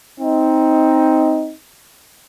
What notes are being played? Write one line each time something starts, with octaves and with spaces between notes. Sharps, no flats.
C4 D#4